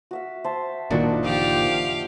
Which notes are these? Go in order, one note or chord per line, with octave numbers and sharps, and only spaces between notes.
F#4 E5 F5
C5 E5 A5
F#1 A#2 D#3 A#3 D4 F#4 D#5 E5
F3 G4 D5 F5